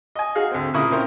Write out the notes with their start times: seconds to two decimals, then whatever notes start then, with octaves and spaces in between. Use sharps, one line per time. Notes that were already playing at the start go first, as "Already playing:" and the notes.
0.15 D#5 G#5
0.35 D#4 F#4 G#4 D#5 F5
0.51 D2 C4
0.74 A#2 C#3 A#3 E4 B5 D#6
0.92 C4 C#4 E4 A#4 C5 C#5